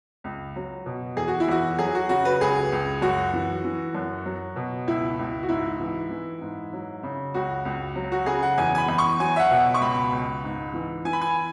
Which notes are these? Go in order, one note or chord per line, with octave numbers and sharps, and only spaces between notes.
C#2
F#3
B2
E2 G#4
F#4
E4
E2 F#4
F#3 G#4
F#4
C#3 F#4
B4
C#2 G#4
C#2
F#2 F#4
E3
E3
F#2
F#3
B2
C#2 E4
C#2
F#4
G#2 E4
E3
E3
G#2
F#3
C#3
C#2 F#4
C#2
F#3
F#4
C#3 G#4
F#5
E2 G#5
G#5
B5
E2
C#6
F#3 G#5
E5
F#5
B2
C#6
C#2 B5
C#2
G#2
E3
E3 G#5
B5
G#5